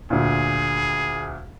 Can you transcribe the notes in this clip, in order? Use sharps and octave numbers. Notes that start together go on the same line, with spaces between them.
D2 A#2 G#4